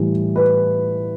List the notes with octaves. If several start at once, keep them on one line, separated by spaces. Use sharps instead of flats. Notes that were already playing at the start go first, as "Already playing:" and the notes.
Already playing: A2 E3 G3
B4